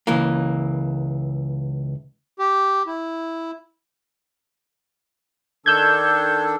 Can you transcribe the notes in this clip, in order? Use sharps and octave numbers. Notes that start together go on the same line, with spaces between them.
C#2 E3 A#3
G4
E4
D#3 D4 A4 E6 G6 G#6